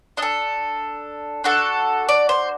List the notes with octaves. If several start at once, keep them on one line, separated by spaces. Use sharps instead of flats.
D4 A4 D#5
D4 F#4 A4
D5
C5